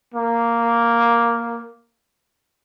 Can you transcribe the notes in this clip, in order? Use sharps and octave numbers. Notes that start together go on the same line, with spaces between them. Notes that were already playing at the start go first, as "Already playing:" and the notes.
A#3